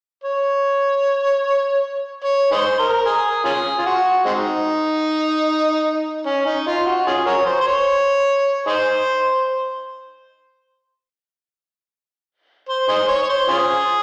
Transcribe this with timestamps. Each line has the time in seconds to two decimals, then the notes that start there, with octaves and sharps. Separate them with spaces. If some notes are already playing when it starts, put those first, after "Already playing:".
0.24 C#5
2.24 C#5
2.52 D#4 G#4 C5
2.79 A#4
3.06 G#4
3.45 C#4 F4 G#4
3.79 F4
3.86 F#4
4.25 G#3 C4 D#4
6.26 C#4
6.46 D#4
6.67 F4
6.86 F#4
7.07 C#4 F4 G#4
7.27 F#4 A#4 C#5
7.46 C5
7.61 C5
7.67 C#5
8.67 D#4 G#4 C5
12.69 C5
12.89 D#4 G#4 C5
13.08 C#5
13.23 C#5
13.30 C5
13.49 C#4 F4 G#4